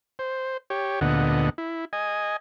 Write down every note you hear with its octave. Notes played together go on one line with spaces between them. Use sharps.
C5
G4 C#5
D2 A#2 D3 B3 D#5 F#5
E4
D#5 G#5